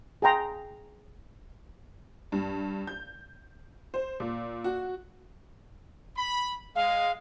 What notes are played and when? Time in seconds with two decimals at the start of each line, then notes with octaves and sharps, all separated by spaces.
0.22 G#4 F5 G5 A#5 C6
2.32 G2
2.87 G6
3.94 C5
4.20 A#2
4.64 F#4
6.17 B5
6.76 G#3 F5